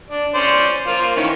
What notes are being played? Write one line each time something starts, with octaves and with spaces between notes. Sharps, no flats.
D4
C#4 C5 D5
F3 A#3 F4
D#3 E3 C#4